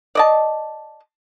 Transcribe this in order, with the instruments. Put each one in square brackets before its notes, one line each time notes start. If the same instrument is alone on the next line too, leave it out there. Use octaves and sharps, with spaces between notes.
[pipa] D5 D#5 A5